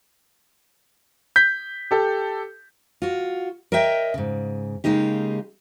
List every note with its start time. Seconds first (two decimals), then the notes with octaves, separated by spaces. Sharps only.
1.36 G6 B6
1.91 G4 A4
3.02 F4 F#4
3.72 A#4 C#5 D#5 E5 G5
4.14 G#2 C#3
4.84 C#3 G#3 A#3 D#4 G4